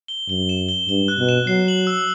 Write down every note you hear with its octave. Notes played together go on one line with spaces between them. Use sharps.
G7
F#2 G7
E7
G7
G2 G7
F#6
B2
E7
F#3 C7
F#7
E6